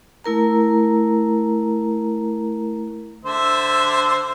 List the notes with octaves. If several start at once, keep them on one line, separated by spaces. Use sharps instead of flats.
A3 E4 A#4 A#5
D3 C5 E5